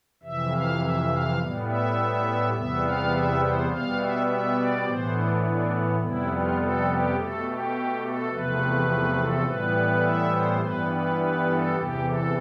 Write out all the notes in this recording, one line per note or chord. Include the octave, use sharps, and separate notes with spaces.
F2 C3 E3 E5
F5
E5
F5
A2 G3 B3
E5
E2 C3 G3 B3 E5
F5
E5
C5
B2 G3 B3 F5
E5
E5
D5
A2 E3 B3 C5
D4
D4
F2 C3 G3 B3 E4
F4
A4
G4
B2 A3 A4
G4
A4
E2 C3 F3 A3 B4
A4
A2 E3 G3 B3 B4
E5
C5
G2 E3 G3 B3 B4
B4
B4
A4
E2 C3 E3 G4
A4